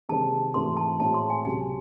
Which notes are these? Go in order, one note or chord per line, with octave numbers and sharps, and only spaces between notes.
C3 D#3 G#3 C4 A5
G#2 E3 A3 C4 F#4 C6
A5
A2 G#3 C4 F#4 A5
C6
G#5
C#2 C3 F#3 G#5